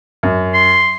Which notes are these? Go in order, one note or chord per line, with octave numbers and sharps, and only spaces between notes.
F#2
C6